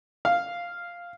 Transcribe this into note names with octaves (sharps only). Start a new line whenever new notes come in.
F5